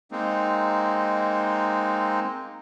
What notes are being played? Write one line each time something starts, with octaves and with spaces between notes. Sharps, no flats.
G#3 A#3 C4 D#4